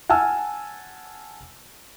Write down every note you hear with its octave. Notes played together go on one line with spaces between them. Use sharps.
F#5 G#5 A5 E6 F6